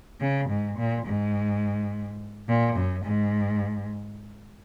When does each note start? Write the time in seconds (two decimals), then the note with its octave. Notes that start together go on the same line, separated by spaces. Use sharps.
0.20 C#3
0.49 G#2
0.78 A#2
1.05 G#2
2.48 A#2
2.76 F#2
3.05 G#2